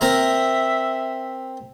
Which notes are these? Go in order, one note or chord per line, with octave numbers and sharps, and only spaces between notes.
C4 A#4 E5 A#5